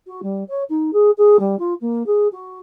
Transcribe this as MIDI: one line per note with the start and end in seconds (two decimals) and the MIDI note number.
0.07 0.20 66
0.22 0.43 55
0.48 0.62 73
0.69 0.91 63
0.93 1.10 68
1.18 1.37 68
1.39 1.58 55
1.59 1.73 65
1.81 2.05 58
2.06 2.28 68
2.32 2.59 66